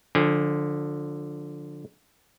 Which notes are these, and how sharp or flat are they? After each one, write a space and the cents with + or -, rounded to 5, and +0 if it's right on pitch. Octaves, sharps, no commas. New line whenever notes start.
D3 +5 F3 +30 G#5 -30